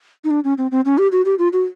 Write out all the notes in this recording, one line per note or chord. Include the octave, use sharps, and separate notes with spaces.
D#4
D4
C#4
C4
C4
C#4
G4
F#4
G4
F4
F#4